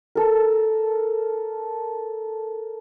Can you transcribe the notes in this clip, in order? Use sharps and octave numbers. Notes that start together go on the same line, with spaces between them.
A4 A#4